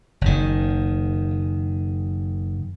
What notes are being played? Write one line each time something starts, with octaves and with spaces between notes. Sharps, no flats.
F#1 D#3